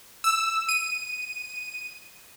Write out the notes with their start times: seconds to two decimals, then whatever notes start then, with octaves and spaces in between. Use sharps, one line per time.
0.24 E6
0.69 D#7